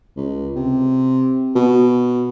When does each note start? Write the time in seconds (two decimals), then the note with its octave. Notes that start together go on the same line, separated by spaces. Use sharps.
0.16 C#2
0.56 C3
1.55 B2